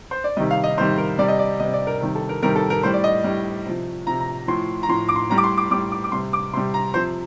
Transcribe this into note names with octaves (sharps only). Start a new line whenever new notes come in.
C5
D5
C3 D#3 G3 D#5
F5
D#5
C3 D#3 G3 C5
A#4
C3 G3 D5
D#5
D5
C3 G3 D#5
D5
A#4
C3 D#3 G3
A4
A#4
C3 D#3 G3 A#4
A4
A#4
A2 G3 C5
D5
D#5
A2 G3
C3 F3
C3 F3 A#5
A#5
A2 F3 C6
A#5
A2 F3 C6
D6
C6
A2 G3 A#5
D6
C6
D6
A2 G3 D6
D6
D6
C3 G3 C6
D6
C3 G3 C6
A#5
C3 F3 C5